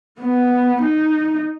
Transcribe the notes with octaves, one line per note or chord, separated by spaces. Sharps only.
B3
D#4